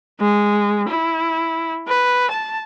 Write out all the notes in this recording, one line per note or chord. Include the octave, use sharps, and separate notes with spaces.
G#3
E4
B4
A5